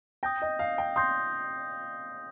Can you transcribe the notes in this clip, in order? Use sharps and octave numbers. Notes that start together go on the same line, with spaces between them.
G5 D#6 G6 A#6
D#5
F5
G5
C6 D#6 G6 A#6